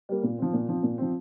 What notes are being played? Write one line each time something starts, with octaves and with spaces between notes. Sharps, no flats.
G3 A#3
A#2
F3 C4
A#2
F3 C4
A#2
F3 C4